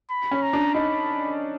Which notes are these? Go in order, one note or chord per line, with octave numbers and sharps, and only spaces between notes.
B5
C#4
A#5
D4
D#4 B5